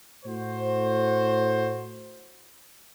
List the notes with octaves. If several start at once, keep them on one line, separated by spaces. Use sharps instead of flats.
A2 F#4 C5